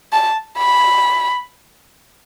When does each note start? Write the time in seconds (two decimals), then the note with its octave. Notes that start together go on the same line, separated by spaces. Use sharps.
0.13 A5
0.59 B5